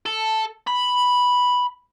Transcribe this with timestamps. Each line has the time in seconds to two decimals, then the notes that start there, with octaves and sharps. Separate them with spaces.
0.06 A4
0.67 B5